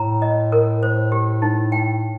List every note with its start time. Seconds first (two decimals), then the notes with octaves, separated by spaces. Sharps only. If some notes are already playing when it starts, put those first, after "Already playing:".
Already playing: A2 A#5
0.22 D#5
0.52 A#4
0.83 C5
1.12 G4
1.42 D#4
1.72 G5